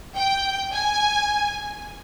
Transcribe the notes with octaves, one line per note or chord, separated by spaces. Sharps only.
G5
G#5